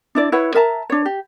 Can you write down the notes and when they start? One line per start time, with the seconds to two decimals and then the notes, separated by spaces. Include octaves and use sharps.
0.15 D4 E4 D5
0.32 E4 B4 C#5 F#5
0.54 A#4 E5 A5 A#5
0.90 D4 C#5
1.05 G4